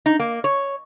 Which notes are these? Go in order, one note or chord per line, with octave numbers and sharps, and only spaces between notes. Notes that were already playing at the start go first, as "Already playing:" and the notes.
D#4
A#3
C#5